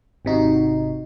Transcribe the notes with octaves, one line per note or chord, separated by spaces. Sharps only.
G#1 C3 D#4 F#4